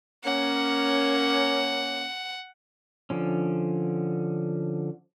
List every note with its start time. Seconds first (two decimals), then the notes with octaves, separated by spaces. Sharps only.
0.25 A#3 C#4 F#5
3.10 D3 F3 C#4